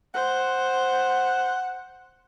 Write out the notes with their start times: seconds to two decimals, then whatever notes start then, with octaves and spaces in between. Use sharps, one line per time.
0.14 C5 F#5